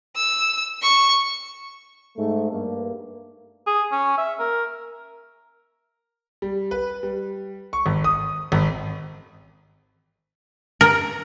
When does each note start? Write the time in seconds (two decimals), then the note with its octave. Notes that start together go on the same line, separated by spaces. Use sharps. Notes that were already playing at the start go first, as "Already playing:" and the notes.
0.16 E6
0.82 C#6
2.17 G#2 A3
2.51 G2 A#3
3.67 G#4
3.92 C#4
4.18 E5
4.39 A#4
6.42 G3
6.71 B4
7.03 G3
7.73 C#6
7.86 G#1
8.04 D#6
8.52 G#1
10.81 A#4